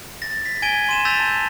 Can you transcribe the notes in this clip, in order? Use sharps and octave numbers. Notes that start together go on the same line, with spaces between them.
A6 A#6
B6
G#5 G#6 B6 D7 D#7 G7
C6 D#7 E7
E6 G6 A6 B6 F7
A5